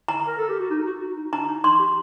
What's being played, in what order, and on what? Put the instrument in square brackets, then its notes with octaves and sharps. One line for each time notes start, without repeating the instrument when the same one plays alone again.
[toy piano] A#5
[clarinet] A#4
A4
G4
F#4
D#4
F#4
F#4
D#4
[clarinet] D4 [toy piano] A#5
[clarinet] D#4
[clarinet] D#4 [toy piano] C6
[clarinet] G4